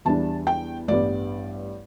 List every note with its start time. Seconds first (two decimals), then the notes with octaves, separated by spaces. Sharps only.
0.05 E2 E3 G3 D4 A5
0.47 G5
0.88 A1 G2 G3 B3 D5